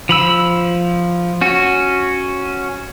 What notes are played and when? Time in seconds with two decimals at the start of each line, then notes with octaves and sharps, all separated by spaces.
0.09 F3 B5 E6
1.41 C#4 F#4